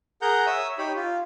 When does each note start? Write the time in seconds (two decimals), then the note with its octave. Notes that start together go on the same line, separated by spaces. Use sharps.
0.22 G#4 A#4 F#5 A#5 G6
0.46 C#5 E5 D#6 E6
0.78 D#4 G4 C#5 B5
0.96 F4